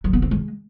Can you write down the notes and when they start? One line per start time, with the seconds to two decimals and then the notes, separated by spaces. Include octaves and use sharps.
0.04 F#3
0.13 B3
0.22 C4
0.31 G#3